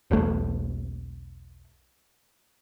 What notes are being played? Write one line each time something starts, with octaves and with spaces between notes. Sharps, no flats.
E1 B1 A3